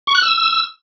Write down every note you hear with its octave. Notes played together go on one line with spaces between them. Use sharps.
C#6
F#6
E6